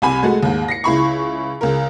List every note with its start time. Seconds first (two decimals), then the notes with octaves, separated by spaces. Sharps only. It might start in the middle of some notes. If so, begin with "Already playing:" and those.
0.02 C2 C3 G#5 B5
0.23 G#3 A3 F#4
0.43 D#2 G#2
0.68 A#6 C7 C#7
0.84 C#2 E4 B5 C#6
1.61 C#2 A#4